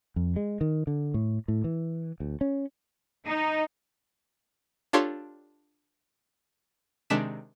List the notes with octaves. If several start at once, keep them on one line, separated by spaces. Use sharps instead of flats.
F2
G#3
D#3
D3
A2
A2
E3
D2
C#4
D#4
D4 F4 G4 A4 C#5 C6
C3 D#3 G#3 D4 B6 E7